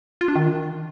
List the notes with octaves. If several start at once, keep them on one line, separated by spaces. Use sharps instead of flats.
F4
D4
D#3